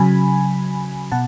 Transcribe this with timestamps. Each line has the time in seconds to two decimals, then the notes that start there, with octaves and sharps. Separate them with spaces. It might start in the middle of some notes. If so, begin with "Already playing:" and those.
Already playing: C#3 F#3 G#5 B5
1.12 B2 F#5 A5